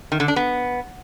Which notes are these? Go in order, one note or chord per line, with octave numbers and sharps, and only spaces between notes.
D#3
D3
D4
B3